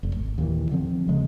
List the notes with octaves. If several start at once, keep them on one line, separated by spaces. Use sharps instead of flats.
F1
G#1
D#2 A#2 E3
D3 F3 C4
D#1 C#3 F3 G#3